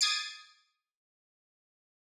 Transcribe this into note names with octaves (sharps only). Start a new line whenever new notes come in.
D#6 G#6 A6 C7 D7